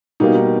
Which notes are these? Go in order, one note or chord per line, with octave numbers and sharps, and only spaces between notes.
B2 G3 A#3 D#4
D#4